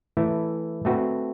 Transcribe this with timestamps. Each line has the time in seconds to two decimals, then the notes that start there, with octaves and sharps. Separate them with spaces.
0.17 E3 A3 E4
0.85 A3 C4 F#4 B4